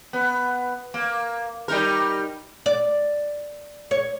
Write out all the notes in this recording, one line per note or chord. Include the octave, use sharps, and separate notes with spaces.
B3
A#3
G3 D#4 A#4
D5
C#5